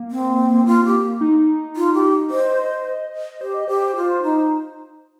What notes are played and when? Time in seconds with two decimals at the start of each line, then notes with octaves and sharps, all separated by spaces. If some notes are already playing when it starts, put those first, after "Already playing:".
Already playing: A#3
0.11 C4
0.66 F4
0.85 G4
1.21 D#4
1.76 F4
1.94 G4
2.30 C5 D#5
3.41 G4 C5
3.54 D#5
3.68 G4 C5
3.96 F4
4.22 D#4